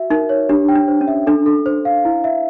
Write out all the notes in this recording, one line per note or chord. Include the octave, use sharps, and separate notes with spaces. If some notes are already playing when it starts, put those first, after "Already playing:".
Already playing: F#4 E5
D#4 A#4
C#5
D4 G4
G5
D4
C5
C#4
E5
D4 A4
A4
C5
F5
E4
E5